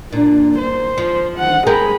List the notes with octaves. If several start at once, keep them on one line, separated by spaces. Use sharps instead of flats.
A#2 D4
C5
F3
F#5
G#3 G4 G#4 A#4 B5